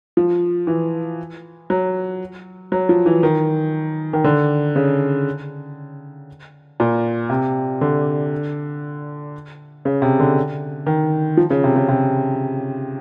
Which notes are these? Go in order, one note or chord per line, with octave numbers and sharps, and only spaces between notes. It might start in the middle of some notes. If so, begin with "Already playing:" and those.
F3
E3
F#3
F#3
F3
E3
D#3
D#3
D3
C#3
A#2
C3
D3
C#3
C3
D3
D#3
F3
C#3
C3
C#3
C3